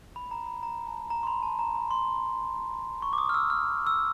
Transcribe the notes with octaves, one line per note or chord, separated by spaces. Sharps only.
B5
A#5
B5
A#5
A5
A#5
C6
B5
A5
A#5
B5
C6
C#6
D6
D#6
F6
E6
F6
E6